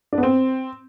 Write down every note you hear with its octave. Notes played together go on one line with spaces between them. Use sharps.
D4
B3
C4